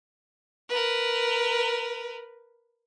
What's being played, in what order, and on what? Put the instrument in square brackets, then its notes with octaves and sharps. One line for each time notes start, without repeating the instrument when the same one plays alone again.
[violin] A#4 B4